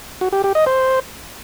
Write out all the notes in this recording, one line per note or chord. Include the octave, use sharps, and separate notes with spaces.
F#4
G4
G4
D#5
C5